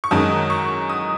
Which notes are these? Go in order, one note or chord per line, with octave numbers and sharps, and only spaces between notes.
C#6
F#2 D#3 G#3 D#6
C#6
D#6